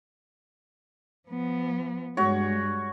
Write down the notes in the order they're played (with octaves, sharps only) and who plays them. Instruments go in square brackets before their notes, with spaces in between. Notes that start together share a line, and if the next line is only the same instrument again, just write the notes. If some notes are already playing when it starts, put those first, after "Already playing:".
[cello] F3 B3
[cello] G2 G#3 [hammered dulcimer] F#4 C#5